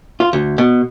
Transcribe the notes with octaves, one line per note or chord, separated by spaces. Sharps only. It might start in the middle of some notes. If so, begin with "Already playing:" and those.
F4
D2
B2